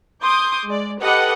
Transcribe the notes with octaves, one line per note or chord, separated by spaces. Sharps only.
C6 D6 D#6 G6
G#3 D5
G4 A4 B4 D#5 F#5